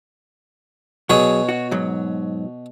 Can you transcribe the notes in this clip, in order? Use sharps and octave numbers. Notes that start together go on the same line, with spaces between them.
B2 F#3 G#4 C#5
F#4
G#2 F#3